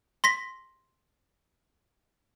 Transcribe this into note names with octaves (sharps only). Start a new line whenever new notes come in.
C6 A#6 B6